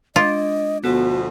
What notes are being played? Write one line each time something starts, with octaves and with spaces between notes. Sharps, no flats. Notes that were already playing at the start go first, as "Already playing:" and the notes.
G#3 D4 F4 D#5 D6
D2 B2 F3 B3 F#4 A4